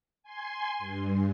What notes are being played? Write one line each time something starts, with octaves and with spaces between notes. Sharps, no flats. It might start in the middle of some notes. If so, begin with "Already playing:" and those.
G#5 C6
G2